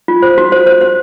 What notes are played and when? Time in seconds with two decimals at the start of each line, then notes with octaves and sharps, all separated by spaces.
0.08 F4
0.22 C5
0.38 F#4
0.52 C5
0.67 C5
0.81 C5